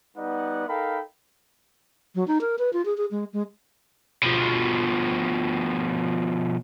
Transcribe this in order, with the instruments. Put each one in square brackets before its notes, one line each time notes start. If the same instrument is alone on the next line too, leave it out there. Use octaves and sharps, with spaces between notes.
[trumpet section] G3 B3 D#4 B4 D5 F#5
D#4 A4 A#4 F5 G5 B5
[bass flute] F#3
D#4
A#4
B4
F4
G#4
G#4
G#3
G#3
[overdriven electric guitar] B2 F3